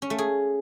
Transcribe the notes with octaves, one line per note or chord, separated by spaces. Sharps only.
C#4
A3
G#4